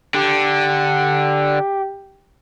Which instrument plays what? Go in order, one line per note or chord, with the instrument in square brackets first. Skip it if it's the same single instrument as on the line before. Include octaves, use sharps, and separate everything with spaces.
[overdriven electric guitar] D3 [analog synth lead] G4